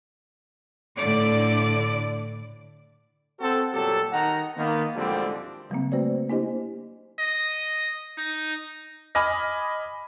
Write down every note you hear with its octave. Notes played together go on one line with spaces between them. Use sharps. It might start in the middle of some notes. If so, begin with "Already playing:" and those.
A2 D3 D5
C4 F#4 A4
G1 A#2 F#3 G4 A4
D#3 F#5 A#5
D#3 A#3 B3
D2 G#2 D3 F3 G3 C4
C#3 F#3 G3 A#3 C4
A3 F#4 B4 C5 D5
A#3 D4 E4 G4 C5 D#5
D#5
D#4
D#5 G#5 B5 D6 F6 A#6